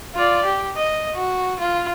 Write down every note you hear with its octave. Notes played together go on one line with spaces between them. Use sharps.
F4 D5
G4
D#5
F#4
F4